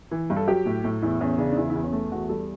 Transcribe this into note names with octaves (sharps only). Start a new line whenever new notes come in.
E3
G2
A4
F#3 G4
A2
A2
E2 E4
E2 C#4
C#3 D4
D4
E2 E4
E4
E2
C#4
A3
E2 F#4
G3 A4